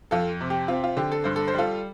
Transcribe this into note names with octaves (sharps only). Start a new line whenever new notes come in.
F2 F4 A4
C3
G4
C4 F4
F4
D3 G4
A4
G2 C5
A4
C5
G3 F4 A4